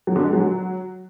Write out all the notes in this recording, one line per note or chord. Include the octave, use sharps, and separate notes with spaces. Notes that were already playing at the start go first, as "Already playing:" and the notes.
F#3
D3
G#3
F#3